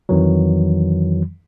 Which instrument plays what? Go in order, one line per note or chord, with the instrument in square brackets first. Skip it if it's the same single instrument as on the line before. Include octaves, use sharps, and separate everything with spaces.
[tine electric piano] F2 D#3 E3 F#3